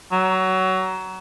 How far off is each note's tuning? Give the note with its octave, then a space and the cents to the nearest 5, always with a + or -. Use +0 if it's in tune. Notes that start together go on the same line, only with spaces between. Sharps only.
F#3 +20